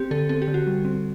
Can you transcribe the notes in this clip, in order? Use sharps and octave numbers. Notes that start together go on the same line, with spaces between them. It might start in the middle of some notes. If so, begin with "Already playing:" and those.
Already playing: C4 G4
D3 A4
C4 A4
G4
D3
F#4
G3
C4